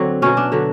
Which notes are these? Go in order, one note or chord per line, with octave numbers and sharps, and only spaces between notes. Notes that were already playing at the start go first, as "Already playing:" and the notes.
Already playing: D3 F#3 C4
B2 F#3 C#4
D4
D3 F#3